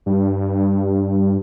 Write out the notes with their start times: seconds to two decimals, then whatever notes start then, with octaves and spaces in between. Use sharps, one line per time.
0.06 G2